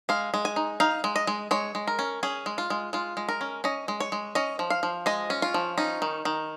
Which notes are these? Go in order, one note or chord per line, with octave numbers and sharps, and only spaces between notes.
G#3 F5
G#3
G#5
D#4
D#4 F5
G#3
D#5
G#3
G#3 C#5
G#3
A#4
C#4
C#4 G#4
G#3
F4
G#3
G#3 F4
G#3
A#4
C#4
C#4 D#5
G#3
C#5
G#3
C#4 D#5
F3
F5
F3
G#3 D#5
C#4
F4
F3
C#4 D#4
D#3
D#3